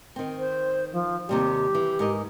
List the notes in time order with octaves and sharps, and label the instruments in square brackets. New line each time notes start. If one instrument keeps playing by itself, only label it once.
[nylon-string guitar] D#3 C4
[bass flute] C5
F3
[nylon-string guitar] D#2 C3 G3 [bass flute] G4
[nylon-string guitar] E3
G#2 A#4 D#5